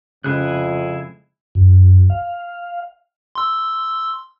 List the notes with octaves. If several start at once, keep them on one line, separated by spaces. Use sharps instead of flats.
F2 C#3 G#3 E4 G#4 B5 F#6
F#2
F5
C6 E6